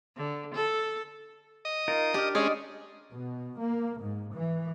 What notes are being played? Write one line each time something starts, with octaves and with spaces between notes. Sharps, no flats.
D3
A4
D#5
D#4 F4 A#4
D4 G4 F6
G#3 C#4 C5 D5 D#5 D#6
B2
A#3
G#2
E3